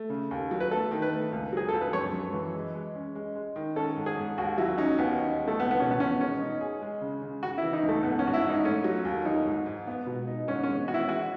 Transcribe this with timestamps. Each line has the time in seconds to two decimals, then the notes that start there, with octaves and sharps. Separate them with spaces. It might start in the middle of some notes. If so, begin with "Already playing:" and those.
Already playing: A3
0.10 C#3
0.31 D#2
0.51 F#3
0.60 B4
0.71 A3 A4
0.91 D#3
1.02 B4
1.12 A3
1.32 C#2
1.53 F#3 G#4
1.69 C#2 A4
1.81 B4
1.93 F#2 C#5
2.13 F#2
2.34 E3
2.54 G#3
2.75 G#3
2.95 C#4
3.15 G#3
3.35 G#3
3.56 D#3
3.76 C#4 A4
3.96 G#2
4.06 G#4
4.17 G#2
4.38 D#2 F#4
4.58 F#3 E4
4.78 C#4 D#4
4.98 D#2 B3
5.19 D#4
5.39 G#3
5.48 A3
5.59 C#2 B3
5.71 B3
5.79 B2 C#4
5.91 B3
6.00 B2 C#4
6.21 G#3 C#4
6.41 D#4
6.61 G#4
6.82 G#3
7.01 C#3
7.22 C#3
7.43 C#3 F#4
7.58 E4
7.63 E3
7.73 D#4
7.83 C#2
7.89 A3
8.03 G#2 B3
8.19 C#4
8.24 G#2 F#4
8.34 E4
8.44 G#2
8.49 D#4
8.65 A3 C#4
8.84 F#3
9.05 D#2
9.25 F#3 D#4
9.46 G#2
9.66 G#2
9.87 B3
10.06 B2
10.27 D#4
10.47 G#2 C#4
10.63 C#4
10.68 G#3
10.88 B3 F#4
10.94 E4
11.04 E4
11.09 G#3 F#4